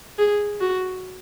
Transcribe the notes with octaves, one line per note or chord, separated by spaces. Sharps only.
G#4
F#4